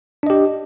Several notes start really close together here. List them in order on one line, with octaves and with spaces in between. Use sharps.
D4 D#5 G4